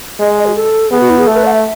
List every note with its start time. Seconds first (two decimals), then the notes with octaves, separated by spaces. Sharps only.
0.20 G#3 D#5
0.38 D#5
0.46 F#4
0.55 A4
0.91 B3 G#4
1.00 F#4
1.10 E4
1.18 G#4
1.27 A3 A4
1.36 B4
1.45 F#5
1.54 E5